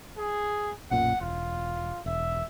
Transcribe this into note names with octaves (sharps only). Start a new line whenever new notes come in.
G#4
B1 F#2 A#2 F#5
E1 F4
E1 E5